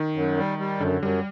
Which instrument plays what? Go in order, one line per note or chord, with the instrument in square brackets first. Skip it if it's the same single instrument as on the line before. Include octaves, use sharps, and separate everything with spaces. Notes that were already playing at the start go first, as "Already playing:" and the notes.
Already playing: [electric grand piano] D#3
[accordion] F#2
G3
G3
[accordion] F#2 [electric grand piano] D3
[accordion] F#2 [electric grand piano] G3